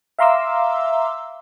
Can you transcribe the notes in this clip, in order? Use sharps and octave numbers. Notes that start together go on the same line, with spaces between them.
E5 F5 A#5 C6 D6 E6